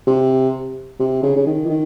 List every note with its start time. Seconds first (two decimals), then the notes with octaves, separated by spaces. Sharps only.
0.07 C3
1.00 C3
1.23 C#3
1.36 C#3
1.46 D#3
1.65 E3
1.69 D#3